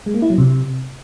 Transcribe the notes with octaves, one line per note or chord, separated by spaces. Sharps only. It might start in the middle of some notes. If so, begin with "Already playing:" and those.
G#3
A#3
E4
F#3
C3